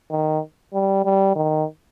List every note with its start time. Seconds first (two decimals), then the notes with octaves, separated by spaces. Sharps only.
0.11 D#3
0.74 G3
1.05 G3
1.36 D#3